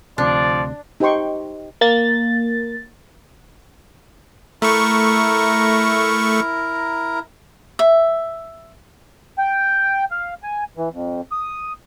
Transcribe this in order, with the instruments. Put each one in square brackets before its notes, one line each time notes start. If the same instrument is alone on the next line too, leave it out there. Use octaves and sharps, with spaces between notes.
[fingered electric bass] D2 C3 [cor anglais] F3 [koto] D4 [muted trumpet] D5
[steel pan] D#4 G4 C5 G5 C6 C#6
[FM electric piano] A#3 A6
[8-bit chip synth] A3 C#6 [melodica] E4 A#4 A#5
[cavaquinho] E5
[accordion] G5
F5
G#5
E3
F2
D#6